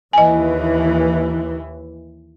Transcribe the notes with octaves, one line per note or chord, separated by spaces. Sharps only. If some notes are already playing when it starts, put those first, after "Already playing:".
D#2 E3 D#5 G#5